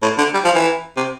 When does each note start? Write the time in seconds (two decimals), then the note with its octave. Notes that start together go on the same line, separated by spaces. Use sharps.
0.02 A2
0.18 D3
0.34 G3
0.44 F3
0.55 E3
0.97 C3